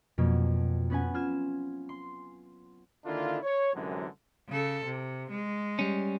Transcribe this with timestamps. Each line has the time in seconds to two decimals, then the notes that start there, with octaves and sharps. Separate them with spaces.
0.18 F2 B2 F#3 A#3
0.90 B3 C#4 B4 F#5 G#5
1.14 F4 F6 G#6 E7
1.89 C6
3.05 D3 D#3 A#3 D4 E4 F4
3.43 C#5
3.74 C2 F#2 D3 E3 F#3 G#3
4.49 C#3 A4
4.85 C3
5.31 G#3
5.79 G3 C#4